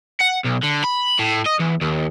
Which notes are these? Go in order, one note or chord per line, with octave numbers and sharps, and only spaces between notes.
F#5
B1
D3
B5
A2
D#5
E2
D#2